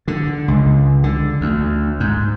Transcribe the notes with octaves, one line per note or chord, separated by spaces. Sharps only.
D3
C#2
D3
D2
G#2